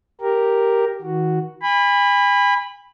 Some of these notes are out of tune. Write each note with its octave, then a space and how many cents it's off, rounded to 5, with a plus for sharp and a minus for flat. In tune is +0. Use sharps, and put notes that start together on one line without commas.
G4 +0 A#4 +0
D#3 +45 F#4 +0
G#5 -40 B5 +0